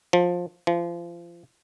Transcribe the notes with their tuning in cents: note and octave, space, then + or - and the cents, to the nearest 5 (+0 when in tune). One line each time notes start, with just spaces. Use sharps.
F3 +15
F3 -30